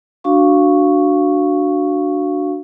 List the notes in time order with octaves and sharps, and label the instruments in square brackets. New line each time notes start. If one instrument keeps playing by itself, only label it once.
[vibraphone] D4 F#4 F5 C#6